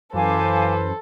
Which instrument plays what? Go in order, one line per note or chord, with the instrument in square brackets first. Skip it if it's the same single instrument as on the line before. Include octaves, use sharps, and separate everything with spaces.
[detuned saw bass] F#2 [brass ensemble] E3 B4 C5 [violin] A4 [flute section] F5 G#5 D6